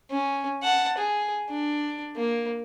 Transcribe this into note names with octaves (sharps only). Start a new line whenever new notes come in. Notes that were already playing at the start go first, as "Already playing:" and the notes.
C#4
F#5 A5
G#4
D4
A#3